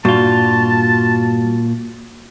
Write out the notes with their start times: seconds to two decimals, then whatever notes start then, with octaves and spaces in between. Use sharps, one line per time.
0.05 G2 A#2 F4 F#4 A5